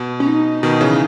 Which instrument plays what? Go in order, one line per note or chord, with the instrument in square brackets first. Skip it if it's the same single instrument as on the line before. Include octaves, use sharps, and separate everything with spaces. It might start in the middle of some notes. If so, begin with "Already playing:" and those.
Already playing: [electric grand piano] B2
[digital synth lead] C#4
D#4
[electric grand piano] B2 D#3
C#3 E3